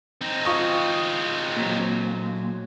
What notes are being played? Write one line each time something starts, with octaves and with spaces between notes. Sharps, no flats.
C4 D#4
F4 C#6 D#6
A#2 F#3